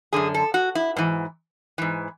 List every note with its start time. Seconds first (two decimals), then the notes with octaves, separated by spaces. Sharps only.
0.13 F#2 D3 G#4
0.34 A4
0.54 F#4
0.75 E4
0.96 G#2 E3
1.78 G#2 E3